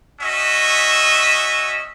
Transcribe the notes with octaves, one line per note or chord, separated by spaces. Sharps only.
C#4 F#4 D#5 E5